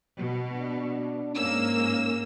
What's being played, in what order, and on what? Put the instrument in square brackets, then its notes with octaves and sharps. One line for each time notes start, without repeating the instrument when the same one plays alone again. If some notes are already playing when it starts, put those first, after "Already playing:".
[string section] B2
[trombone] D4
[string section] G#2 A#3 E6 [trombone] C#4